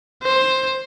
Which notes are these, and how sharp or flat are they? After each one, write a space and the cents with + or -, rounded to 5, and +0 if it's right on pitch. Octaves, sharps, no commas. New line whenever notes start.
C5 +10